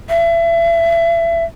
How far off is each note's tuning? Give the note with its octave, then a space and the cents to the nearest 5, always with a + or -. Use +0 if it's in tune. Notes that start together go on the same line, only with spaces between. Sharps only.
E5 +30